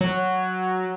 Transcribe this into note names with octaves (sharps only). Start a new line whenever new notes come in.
F#3